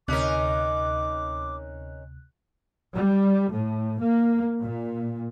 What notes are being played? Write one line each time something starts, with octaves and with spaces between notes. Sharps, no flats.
D2 C3 C#4 D#4 A#4 D6 F#6
G3
A2
A#3
A#2